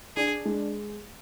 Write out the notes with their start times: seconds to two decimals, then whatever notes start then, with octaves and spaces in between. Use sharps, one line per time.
0.16 D4 G#4
0.45 G#3